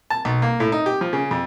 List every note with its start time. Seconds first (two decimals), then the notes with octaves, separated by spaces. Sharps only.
0.10 A5
0.25 B1
0.42 A#3
0.60 A2
0.72 D#4
0.86 G4
1.01 F3
1.13 C#3
1.31 F2